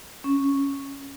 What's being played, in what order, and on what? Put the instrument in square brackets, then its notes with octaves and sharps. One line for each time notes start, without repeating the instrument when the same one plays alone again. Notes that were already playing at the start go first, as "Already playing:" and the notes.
[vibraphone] C#4